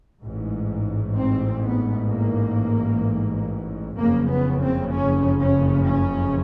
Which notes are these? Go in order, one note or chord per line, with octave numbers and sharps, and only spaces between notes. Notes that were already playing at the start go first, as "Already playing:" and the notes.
A1 G#2
C4
B3
A#3
F#1 F2 C#3 A#3
B3
C4
C#4
C#4
C#4